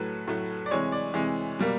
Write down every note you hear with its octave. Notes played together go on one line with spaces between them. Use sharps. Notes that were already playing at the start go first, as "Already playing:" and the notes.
Already playing: A2 F#3 A3 B4
A2 F#3 A3
D5
C3 E3 G#3 C#5
D5
C3 E3 G#3
B2 G3 A#3